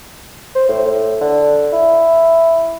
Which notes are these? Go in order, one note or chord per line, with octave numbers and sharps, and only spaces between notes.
C5
A2
A2
D3
E4